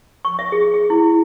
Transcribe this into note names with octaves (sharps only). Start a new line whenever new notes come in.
C#6
E5
G#4
G#4
E4